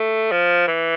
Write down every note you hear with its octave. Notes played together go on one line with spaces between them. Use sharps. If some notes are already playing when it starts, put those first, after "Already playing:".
Already playing: A3
F3
E3